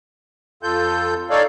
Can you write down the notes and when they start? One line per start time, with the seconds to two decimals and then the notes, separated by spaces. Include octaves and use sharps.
0.63 F2 F4 A4 G6
1.30 D#4 A4 C#5 D5 F5